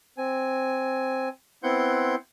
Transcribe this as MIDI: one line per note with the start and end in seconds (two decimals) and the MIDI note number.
0.18 1.29 60
0.18 1.29 80
1.63 2.15 59
1.63 2.15 60
1.63 2.15 64
1.63 2.15 78
1.63 2.15 84
1.63 2.15 91